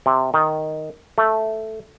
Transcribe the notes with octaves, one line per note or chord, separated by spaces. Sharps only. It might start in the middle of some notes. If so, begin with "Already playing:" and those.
C3
D#3
A3